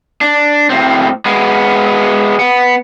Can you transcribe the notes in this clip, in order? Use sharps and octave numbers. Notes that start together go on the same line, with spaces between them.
D4
A2 C4
G#3 B3
B3